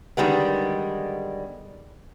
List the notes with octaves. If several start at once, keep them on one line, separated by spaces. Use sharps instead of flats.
D3 D#3 G3 G#3 B3